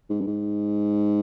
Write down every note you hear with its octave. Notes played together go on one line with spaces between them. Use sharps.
G#2
G2
G#2